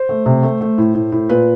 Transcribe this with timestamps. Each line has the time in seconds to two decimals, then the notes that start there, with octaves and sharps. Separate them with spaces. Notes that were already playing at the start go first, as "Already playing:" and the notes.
Already playing: C5
0.09 A3
0.26 C3
0.43 A3
0.61 A3
0.78 A2
0.95 A2
1.12 A2
1.29 A#2 B4